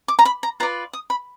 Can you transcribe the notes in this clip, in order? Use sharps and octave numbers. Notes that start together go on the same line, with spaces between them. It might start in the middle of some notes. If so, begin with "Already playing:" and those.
D6
A#5
B5
A#5
F4 B4 D5 A#5
D#6
B5